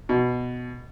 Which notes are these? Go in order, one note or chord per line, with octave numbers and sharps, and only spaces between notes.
B2